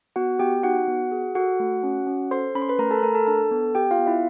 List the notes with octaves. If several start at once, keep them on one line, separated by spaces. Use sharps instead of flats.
B3 F#4 F#5
B3 G4 G5
D#4 F#4 F#5
B3
G#4
F#4 A4 F#5
A3
C#4
C#4
A4 C5 C6
C#4 B5
C6
B4 B5
A3 A#4 A#5
A4 A5
B5
A3 A#4 A#5
A4 A5
D4 A4 A5
B3
G4 G5
F4 F5
B3
E4 E5